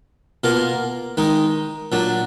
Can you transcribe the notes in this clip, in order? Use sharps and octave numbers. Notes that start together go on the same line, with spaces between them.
B2 A#3 F4 A#4
D#3 G#3 D#4
A#2 F#3 D4